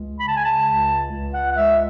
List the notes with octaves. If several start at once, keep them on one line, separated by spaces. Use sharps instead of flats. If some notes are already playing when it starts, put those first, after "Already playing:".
Already playing: C#2 G#3
C#3 B5
A5
G#5
A5
C#2
C#2
F#5
F#5
G#3 E5